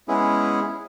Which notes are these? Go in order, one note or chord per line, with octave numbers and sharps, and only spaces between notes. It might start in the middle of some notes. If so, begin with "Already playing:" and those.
G#3 B3 C#4 E4 G#4